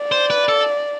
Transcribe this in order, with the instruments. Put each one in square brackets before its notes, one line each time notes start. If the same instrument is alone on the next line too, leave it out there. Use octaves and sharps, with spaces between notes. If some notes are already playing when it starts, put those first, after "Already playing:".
Already playing: [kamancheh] D5
[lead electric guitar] C5
B4
A4